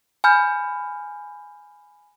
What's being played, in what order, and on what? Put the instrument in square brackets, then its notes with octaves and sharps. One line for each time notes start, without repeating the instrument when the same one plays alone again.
[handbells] G#5 B5 F6 G6